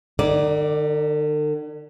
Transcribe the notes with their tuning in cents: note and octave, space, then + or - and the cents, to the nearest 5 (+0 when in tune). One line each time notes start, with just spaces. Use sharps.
D3 +45 D#4 +10 D5 +0